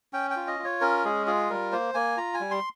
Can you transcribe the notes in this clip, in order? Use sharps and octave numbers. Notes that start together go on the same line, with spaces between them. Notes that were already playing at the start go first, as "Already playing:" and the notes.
C#4 G5
G5
F4
D#5
F4
C#5
C#4 A#4
G#3 G#4
F4 G#4
G3 A#4
A#3 C5
A#3 G#5
F4 A#5
G#5
G3
C6